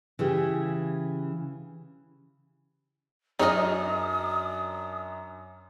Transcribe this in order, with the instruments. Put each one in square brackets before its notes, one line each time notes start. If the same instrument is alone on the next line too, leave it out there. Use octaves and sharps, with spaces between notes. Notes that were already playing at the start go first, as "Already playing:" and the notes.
[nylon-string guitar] C#3 E3 E4 G4
[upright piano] F#2 D4 F6 [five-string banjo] D#4 C#5 [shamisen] G#4 D#5 [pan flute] D#6